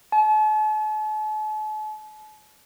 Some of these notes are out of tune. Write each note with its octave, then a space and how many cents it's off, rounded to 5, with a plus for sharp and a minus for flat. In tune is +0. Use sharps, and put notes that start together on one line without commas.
A5 -45